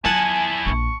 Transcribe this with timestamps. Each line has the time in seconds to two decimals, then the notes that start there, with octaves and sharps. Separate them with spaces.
0.05 F#3 E4 F4 G#4 F#5 G#5 A5
0.66 A#1 D4 C#6